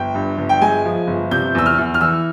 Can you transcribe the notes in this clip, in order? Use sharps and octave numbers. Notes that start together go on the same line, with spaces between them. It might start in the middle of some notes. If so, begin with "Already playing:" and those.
Already playing: G1 G5
G2
G1
G5
G#3 G#5
F3
G1
C3 G6
E2 E6
F6
E2
F6
E3 E6